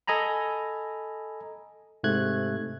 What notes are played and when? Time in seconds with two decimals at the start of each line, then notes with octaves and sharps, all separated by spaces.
0.07 A4 D#5 G#5 A#5 B5
2.04 G#2 C3 A3 F#6 G#6